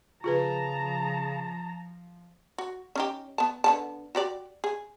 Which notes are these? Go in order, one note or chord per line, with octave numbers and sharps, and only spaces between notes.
C#3 F3 F4 G#4 B4 A5 A#5
F#4
C#4 D#4 G4
B3 A5
D3 B3 A5
F#4 G4 D5
G#4